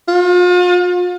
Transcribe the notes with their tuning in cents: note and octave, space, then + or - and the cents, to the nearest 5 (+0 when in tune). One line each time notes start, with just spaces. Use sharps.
F4 +40